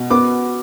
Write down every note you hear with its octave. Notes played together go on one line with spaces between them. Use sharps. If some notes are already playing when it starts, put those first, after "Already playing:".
Already playing: B2
B3 D6